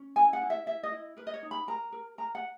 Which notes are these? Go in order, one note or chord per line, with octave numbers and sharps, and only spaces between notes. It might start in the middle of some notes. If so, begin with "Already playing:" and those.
Already playing: C#4
E4 G#5
F#5
E4
E5
E4 E5
D#5
E4
A#4 B4
D#5
C#5
D#4
B5
A#4 A#5
A#4
A#4 A#5
F#5